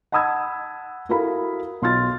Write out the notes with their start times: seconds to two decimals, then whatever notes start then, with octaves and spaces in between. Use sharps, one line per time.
0.12 F#5 A5 B5 D#6 E6 G#6
1.09 E4 F#4 A4 A#4 F5 B5
1.82 B1 F4 C6 F6 A6